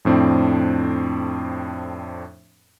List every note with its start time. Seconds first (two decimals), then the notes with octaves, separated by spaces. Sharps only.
0.05 F2 A2 C4 D4